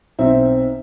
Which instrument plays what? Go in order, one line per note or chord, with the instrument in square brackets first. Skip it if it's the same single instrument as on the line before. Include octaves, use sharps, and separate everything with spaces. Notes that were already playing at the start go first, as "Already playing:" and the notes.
[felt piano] B1 C4 D#4 E5